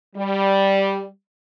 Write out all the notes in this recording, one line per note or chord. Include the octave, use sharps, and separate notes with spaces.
G3